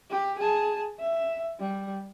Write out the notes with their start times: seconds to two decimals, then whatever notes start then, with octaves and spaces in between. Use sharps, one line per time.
0.11 G4
0.39 G#4 A5
0.99 E5
1.59 G3